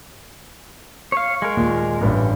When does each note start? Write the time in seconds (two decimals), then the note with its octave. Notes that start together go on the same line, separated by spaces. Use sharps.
1.12 C#5 F5
1.42 G#3 A#4
1.57 D#2 A#2
2.01 A1 G2